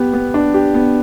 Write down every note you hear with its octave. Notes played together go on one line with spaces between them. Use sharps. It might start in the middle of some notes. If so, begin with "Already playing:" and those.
Already playing: B3 G4
B3
D4
G4
B3